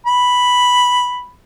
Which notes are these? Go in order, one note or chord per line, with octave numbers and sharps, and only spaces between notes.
B5